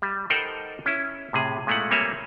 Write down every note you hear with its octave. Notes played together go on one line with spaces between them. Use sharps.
G3
D#4 A4 A#4 C5 F#5 G5
C#4 E4
A2 C3 G#4
A#2 G#3 A3 E4 F#5
G3 A#3 C4 C#5 E5 G#5